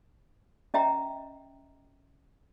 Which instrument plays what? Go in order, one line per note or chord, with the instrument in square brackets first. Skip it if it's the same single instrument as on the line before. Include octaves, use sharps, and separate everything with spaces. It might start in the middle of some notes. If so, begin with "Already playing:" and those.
[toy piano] C#4 D#5 E5 G5 A#5